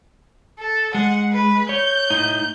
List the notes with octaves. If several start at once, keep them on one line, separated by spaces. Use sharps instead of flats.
A4
G#3 F#5
B4
C#5 G6
A2 D#4